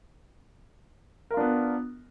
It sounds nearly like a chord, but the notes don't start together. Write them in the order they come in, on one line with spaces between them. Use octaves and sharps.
A#4 F4 D4 B3